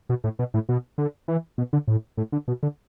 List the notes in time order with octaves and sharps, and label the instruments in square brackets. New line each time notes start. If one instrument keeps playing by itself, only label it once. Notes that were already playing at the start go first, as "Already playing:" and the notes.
[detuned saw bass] B2
A2
B2
A2
B2
D3
E3
B2
D3
A2
A2
D3
B2
D3